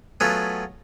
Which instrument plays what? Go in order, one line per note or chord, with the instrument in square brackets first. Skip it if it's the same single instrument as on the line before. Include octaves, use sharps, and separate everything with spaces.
[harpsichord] F#3 A3 B3 F4 G#4